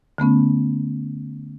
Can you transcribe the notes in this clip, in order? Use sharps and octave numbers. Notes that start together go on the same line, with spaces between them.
D3 A3 B3 C#4